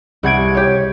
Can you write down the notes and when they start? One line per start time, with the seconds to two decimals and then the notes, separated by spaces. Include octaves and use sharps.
0.23 C2 F#5 G#6 D7
0.55 G4 C#5